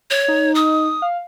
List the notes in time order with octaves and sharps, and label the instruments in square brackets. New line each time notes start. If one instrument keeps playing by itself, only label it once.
[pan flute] C#5
[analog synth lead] D#4
[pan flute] D#6
[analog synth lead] F5